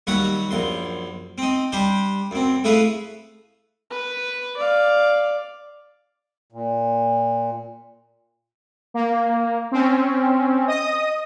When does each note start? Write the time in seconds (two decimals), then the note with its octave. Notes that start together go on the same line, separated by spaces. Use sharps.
0.07 D#2 F#3 G3 C#5 F#5 B5
0.51 A#1 F#2 C6
1.38 C4 D#4
1.72 G3 D4 G4 C5
2.31 F#2 C4
2.64 A3 E4 G#4 B4 F5
3.91 B4
4.57 D5 F5
6.52 A#2
8.94 A#3
9.72 C4 C#4
10.68 D#5 D#6